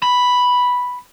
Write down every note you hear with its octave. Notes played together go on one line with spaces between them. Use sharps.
B5